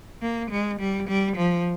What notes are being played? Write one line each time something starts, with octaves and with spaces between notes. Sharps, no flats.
A#3
G#3
G3
G3
F3